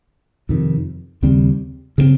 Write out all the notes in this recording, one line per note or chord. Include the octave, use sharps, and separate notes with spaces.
F2 C3 D#3
D#2 C#3 G3 C4
C#3 G3 C4